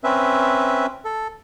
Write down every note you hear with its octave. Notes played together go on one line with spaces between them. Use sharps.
C4 C#4 B4 E5
A4